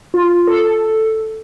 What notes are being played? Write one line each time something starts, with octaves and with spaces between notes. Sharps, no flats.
F4
A4